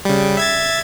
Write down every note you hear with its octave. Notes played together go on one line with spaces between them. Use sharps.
C#3 G3
E5 G#6 A6